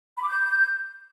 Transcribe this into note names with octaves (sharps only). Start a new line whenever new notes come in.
B5
D6
G6